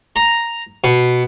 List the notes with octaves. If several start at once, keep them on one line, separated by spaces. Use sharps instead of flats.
A#5
B2